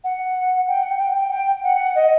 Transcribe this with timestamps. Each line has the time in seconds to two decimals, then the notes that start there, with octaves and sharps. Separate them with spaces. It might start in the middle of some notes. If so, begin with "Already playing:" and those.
0.04 F#5
0.68 G5
0.83 F#5
0.99 G5
1.15 G5
1.31 G5
1.63 F#5
1.95 D#5